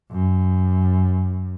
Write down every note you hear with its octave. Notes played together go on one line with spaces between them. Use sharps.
F#2